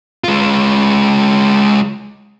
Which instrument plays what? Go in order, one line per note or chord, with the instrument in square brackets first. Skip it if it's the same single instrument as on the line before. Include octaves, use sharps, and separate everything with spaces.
[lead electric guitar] G#3 F4